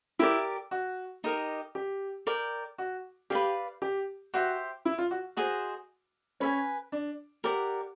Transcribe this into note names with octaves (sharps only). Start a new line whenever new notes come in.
E4 G4 A#4 D5
F#4
D#4 G4 A#4 D#5
G4
A#4 D5 G5
F#4
G4 B4 D5 F5
G4
F#4 G4 C5 E5
E4
F4
F#4
F#4 G#4 C5 D#5
C#4 B4 E5 G#5
D4
G4 A#4 D5 F#5